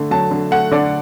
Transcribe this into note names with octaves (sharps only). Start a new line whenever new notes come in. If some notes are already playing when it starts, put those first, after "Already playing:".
Already playing: D3 A3
F#3 A5
D3
A3 F#5
D3 D5